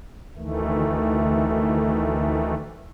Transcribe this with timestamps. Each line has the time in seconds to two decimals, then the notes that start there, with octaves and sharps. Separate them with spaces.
0.37 D2 D#3 E3 A3